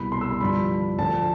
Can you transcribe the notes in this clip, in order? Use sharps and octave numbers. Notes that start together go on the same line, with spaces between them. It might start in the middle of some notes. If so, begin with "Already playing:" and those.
Already playing: C2 B2 B5
C6
E6
C6
G2 D3 F3 B5
D2 D3 F3 A5